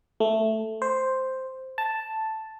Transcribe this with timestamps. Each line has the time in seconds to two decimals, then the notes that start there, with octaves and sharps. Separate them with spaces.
0.20 A3
0.82 C5
1.78 A5